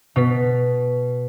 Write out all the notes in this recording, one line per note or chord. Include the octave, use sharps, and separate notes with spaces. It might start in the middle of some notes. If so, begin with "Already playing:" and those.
B2 B6